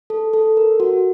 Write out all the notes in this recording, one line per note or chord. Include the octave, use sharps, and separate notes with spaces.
A4
A4
A#4
F#4